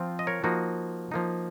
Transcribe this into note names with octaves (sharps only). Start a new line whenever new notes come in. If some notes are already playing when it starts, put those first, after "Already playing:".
Already playing: F3 C4 F4
D#5
A#4 C#5
F3 A#3 D#4 F#4
F3 A#3 D#4